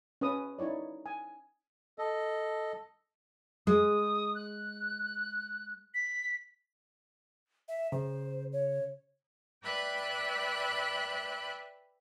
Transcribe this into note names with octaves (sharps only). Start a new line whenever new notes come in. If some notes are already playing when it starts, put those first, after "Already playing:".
C#4 B4 D#6
D#4 E4 C#5 D5
G#5
A4 D#5
G#3 D#6
F#6
B6
E5
C#3 C5
C#5
B4 D5 E5 G5 B5 F#6